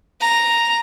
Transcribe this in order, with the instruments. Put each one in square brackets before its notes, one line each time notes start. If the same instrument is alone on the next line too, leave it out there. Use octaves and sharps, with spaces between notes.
[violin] A#5